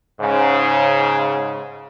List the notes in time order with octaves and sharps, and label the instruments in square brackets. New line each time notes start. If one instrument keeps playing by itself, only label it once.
[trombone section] G#2 C#3